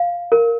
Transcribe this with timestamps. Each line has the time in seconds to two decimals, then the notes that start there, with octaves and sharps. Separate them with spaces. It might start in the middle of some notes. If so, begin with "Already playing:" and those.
Already playing: F5
0.32 A#4